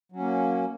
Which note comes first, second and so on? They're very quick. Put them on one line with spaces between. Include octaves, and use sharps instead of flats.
F#3 C#4 A#3